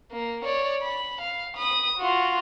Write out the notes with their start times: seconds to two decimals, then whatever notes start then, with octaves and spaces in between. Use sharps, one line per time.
0.12 A#3
0.45 C#5 D5
0.83 B5
1.21 F5
1.57 B5 D#6
1.98 F4 F#4